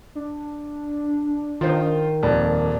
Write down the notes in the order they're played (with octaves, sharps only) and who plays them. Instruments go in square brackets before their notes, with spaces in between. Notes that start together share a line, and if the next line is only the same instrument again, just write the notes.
[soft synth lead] D4
[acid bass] D#3 [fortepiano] F4 C5
[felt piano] D#1 A#3 [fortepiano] F2 [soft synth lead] D5